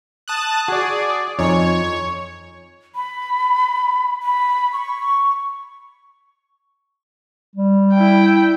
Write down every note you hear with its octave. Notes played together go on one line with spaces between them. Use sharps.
A5 D#6 F#6
F#4 G#4 D5
F2 D#4 C#5 G#5
B5
B5
C#6
G3
E4 G5